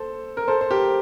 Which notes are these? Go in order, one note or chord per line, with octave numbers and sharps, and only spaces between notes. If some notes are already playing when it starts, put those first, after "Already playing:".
Already playing: A4 C5
A#4
A4 C5
C5
G4 A#4